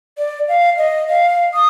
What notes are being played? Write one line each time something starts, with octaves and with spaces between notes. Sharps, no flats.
D5
F5
D#5
F5
D#6